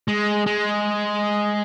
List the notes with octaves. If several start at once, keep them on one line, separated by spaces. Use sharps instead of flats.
G#3
G#3